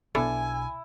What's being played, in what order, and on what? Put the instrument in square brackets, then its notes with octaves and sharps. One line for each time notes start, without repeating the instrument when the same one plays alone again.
[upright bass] B1 [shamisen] B3 D4 A4 [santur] E4 [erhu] G#5